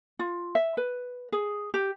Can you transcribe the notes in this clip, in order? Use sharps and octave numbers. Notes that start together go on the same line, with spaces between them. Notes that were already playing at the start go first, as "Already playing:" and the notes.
F4
E5
B4
G#4
G4